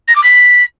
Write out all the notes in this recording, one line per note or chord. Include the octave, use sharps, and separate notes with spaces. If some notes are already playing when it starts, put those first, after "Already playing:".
A#6
D6
B6